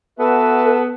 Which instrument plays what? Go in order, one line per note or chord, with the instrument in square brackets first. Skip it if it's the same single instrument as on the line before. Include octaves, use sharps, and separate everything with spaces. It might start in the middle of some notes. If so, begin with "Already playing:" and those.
[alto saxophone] B3 [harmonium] F#4 B4 E5 [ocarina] A4 [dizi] A5